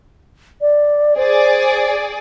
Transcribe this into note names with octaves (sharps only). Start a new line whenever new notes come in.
D5
G#4 C5 D5